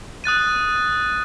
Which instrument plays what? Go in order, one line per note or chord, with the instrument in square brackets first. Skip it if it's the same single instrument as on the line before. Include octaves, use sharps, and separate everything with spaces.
[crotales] D#6 F#6 A6 D#7